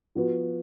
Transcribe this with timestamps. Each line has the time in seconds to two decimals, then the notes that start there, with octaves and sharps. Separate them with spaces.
0.15 F3 B3 F#4 B4